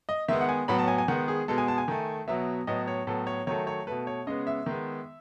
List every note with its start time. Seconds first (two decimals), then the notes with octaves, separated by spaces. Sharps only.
0.09 D#5
0.28 D#3 G#3 B3 E5
0.41 F#5
0.49 G#5
0.68 A2 F#3 B3 B5
0.79 A5
0.88 G#5
0.98 G#5
1.08 D#3 G#3 B3 F#5
1.28 G#4
1.48 B2 G#3 B3 A4
1.58 G#5
1.68 A5
1.78 G#5
1.88 D#3 A3
2.28 B2 F#3 B3 E5
2.67 A2 F#3 B3 D#5
2.88 C#5
3.07 A2 F#3 B3 A4
3.27 C#5
3.47 D#3 F#3 A3 C#5
3.67 C#5
3.87 B2 A3 B4
4.07 C#5
4.27 C#3 G#3 B3 D#5
4.47 E5
4.66 D#3 G#3 B3